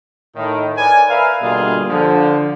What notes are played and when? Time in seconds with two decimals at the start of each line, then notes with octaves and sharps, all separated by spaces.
0.36 A2 D#3
0.77 A#4 B4 D5 G#5
1.09 A#4 B4 E5 F5
1.42 B2 D3 G3 A#3 F4 G#4
1.90 D3 F3